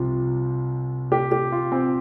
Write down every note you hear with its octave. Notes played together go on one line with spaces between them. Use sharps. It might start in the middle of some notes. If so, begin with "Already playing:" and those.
Already playing: C2 C3 F3 F4
G4
G4
F4
C4